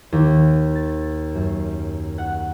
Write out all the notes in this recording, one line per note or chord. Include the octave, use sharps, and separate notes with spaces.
D#2
A6
F#2
F#5